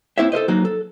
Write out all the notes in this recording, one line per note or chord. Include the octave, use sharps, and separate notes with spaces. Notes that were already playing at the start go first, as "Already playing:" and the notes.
A#3 C4 E4 C5 C#5 E5
A4 A#4 C5 D#5
F#3 A#3 D#4 F#4
A4